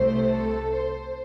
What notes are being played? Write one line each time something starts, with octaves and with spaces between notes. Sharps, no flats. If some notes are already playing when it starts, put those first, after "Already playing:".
Already playing: C2 C3 A3 C5
A4
C5